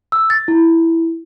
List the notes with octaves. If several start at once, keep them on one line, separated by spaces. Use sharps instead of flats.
E6
A6
E4